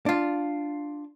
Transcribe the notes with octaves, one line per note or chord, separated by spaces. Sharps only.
D4 F4